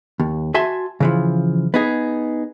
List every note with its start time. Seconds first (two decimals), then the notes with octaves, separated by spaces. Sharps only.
0.20 D#2
0.54 F#4 E5 G#5 A5 C6
1.00 C#3 E3 F3
1.74 B3 D#4 G#4